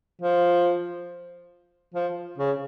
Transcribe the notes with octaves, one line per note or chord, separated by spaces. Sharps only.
F3
F3
C#3